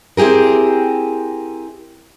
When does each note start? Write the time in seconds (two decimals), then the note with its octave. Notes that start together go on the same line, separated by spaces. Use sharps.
0.17 C4 E4 G4 G#4 A#4